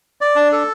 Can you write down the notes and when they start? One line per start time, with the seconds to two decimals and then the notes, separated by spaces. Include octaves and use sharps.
0.21 D5
0.36 D4
0.52 A4